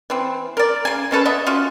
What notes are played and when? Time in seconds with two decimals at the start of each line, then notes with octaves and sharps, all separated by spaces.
0.10 E3 C4
0.57 A#4 D5
0.85 C#3 G#5
1.11 G#3 C#4 A4 B4
1.25 B3 D#5 E5
1.46 C#4 F4 F#4